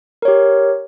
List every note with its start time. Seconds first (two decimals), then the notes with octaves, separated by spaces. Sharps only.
0.22 A#4
0.25 C#5
0.28 G4